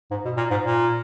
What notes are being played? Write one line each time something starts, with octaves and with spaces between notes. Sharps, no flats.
G#2
B2
A#2
G#2
A#2